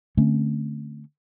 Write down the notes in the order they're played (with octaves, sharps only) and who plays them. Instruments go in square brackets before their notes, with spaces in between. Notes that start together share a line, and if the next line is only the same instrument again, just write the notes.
[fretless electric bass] D3 A3 C4 C#4